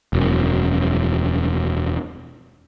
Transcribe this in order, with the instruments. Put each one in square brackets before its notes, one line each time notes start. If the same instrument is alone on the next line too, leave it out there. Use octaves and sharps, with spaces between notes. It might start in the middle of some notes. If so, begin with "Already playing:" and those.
[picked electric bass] E1 F#2